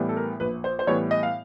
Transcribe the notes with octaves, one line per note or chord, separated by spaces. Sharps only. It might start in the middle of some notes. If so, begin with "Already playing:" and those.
Already playing: A2 E3 G3 B3
A4
A#4
A#1 B4
C5
C5
A2 E3 G3 B3 C#5
D#5
F5